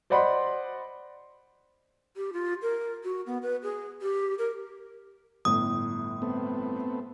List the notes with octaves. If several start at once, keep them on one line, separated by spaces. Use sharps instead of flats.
C5 D5 D#5 F#5 B5 C6
G4
F4
A#4
F#4
B3
B4
G#4
G4
A#4
G1 A2 D#6
A3 B3 C4